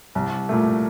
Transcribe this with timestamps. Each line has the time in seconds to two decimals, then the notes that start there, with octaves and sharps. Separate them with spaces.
0.15 C2
0.49 A#2 A3